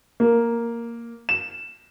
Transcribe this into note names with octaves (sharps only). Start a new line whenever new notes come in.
A#3
E7